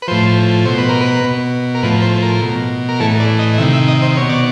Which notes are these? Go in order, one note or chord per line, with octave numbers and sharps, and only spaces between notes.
B4
A2 F3 C5
B2 C5
B4
A#4
B4
B2
A#4
A2 F3 B4
C5
A#4
B2
A#4
A2 E3 A4
D5
D#5
C3 D#3 E5
E5
D#5
C5
B2 C#5
D5